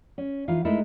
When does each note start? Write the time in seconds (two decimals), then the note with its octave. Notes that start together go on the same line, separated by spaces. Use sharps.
0.18 C#4
0.48 E3 D#4 F4 F5
0.65 G#3 A3 D#4 E4 A4 A#4